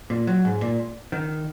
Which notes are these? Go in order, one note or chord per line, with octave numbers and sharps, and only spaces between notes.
A#2
F#3
G#2
A#2
D#3